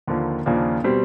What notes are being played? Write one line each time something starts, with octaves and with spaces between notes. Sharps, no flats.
D#2 D3 F3 A#3
D#2 C#3 F3 A#3 D4
B2 G3 C4